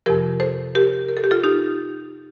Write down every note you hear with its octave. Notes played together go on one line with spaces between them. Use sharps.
F2 C3 F3 G4 A#4
A4 C5
G4 A#4
A#4
A4
G4
F4 A4
D#4 G4